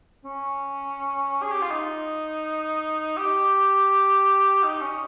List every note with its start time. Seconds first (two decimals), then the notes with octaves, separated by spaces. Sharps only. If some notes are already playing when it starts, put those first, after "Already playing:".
0.25 C#4
1.42 G#4
1.51 G4
1.62 F4
1.71 D#4
3.17 G4
4.63 D#4
4.81 C#4